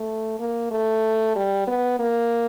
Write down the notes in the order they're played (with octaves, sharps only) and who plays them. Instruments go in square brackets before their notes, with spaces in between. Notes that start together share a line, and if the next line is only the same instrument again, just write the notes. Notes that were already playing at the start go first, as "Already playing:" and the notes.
Already playing: [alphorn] A3
A#3
A3
G3
B3
A#3